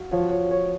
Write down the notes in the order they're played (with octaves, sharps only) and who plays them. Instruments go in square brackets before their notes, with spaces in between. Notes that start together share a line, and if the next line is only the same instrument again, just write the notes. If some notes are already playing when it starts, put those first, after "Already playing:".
Already playing: [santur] F#4 F5
[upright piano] F3 [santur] C#5
[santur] C#5
C#5